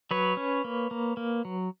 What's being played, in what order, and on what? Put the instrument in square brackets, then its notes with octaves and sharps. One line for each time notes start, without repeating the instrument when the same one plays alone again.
[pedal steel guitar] F#3 B4 C#5
C#4
A#3
A#3
A#3
F#3